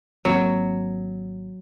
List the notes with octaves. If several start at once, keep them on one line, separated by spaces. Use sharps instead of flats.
G#1 F#3 A#3 C4